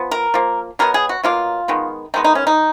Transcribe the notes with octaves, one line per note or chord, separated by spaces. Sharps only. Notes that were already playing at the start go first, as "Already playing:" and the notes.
Already playing: F3 B3
A#4
F3 A#3
B2 F#3 B3 A#4
G#4
F#4
B2 F#3 A#3 F4
D#3 G#3 B3
D#3 G#3 B3 D#4
D#4
C#4
D#4